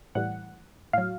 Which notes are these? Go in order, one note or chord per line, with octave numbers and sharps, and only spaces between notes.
A2 E3 G3 F#5
A2 F#3 F5